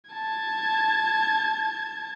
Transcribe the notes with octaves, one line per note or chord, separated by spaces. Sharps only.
A5 G#6